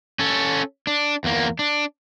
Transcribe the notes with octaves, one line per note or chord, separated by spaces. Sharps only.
C#4 A4
D4
E2 A#3
D4